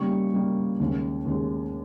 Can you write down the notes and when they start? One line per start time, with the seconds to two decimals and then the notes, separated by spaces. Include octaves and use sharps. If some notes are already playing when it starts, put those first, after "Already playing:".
Already playing: C#3 G3 A#3 D#4 C#6
0.34 C#3 G3 A#3 D#4
0.80 D#2 C#3 G#3
1.25 D#2 C#3 G#3